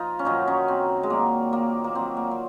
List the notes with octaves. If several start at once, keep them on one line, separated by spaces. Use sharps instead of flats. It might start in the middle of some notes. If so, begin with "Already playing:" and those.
Already playing: F3 D#4 F4
C#4
F#2 D#3 F#3 D#4
C#4
C4
G#3
A#2 F#3 A#3
A#3
A#3
A#2 F#3 C4
A#3
C4